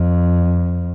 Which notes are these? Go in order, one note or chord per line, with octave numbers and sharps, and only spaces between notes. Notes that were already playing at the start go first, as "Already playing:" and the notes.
Already playing: F2